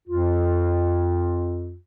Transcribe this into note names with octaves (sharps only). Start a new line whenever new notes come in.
F2 F4